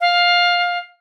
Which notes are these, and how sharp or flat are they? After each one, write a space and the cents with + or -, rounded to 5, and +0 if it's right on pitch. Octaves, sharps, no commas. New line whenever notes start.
F5 +15